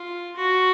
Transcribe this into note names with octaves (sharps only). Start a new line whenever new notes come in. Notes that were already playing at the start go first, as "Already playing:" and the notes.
Already playing: F4
F#4